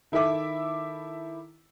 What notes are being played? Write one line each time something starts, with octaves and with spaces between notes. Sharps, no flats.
D#3 E4 A4 E5 D6